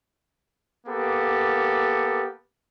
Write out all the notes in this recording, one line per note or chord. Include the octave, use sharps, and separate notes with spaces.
A#3 B3 G4 A4